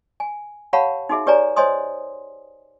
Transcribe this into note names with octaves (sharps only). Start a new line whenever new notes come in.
G#5
G4 C#5 F5 F#5 A5 B5
D#4 F#4 G#4 E5
G4 B4 C#5 D5 G#5 A#5
C5 C#5 D#5 G#5 C6 D#6